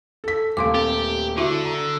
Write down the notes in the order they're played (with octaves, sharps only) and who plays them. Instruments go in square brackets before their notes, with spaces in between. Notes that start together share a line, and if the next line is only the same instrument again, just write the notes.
[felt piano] A4 B6
[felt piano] D#1 A3 [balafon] F5 C6 D6
[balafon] C4 [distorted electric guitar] G4
[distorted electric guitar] D3 [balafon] E4 F#4 E5
[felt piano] A#5